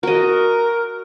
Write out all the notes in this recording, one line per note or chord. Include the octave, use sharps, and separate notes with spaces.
F#4 A#4 D#5